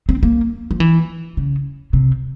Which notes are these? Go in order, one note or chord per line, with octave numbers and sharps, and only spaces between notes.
C4
A#3
F3
E3
C#3
C3